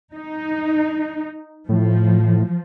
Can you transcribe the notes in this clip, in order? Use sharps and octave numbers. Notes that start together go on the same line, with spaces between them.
D#4
A2 F3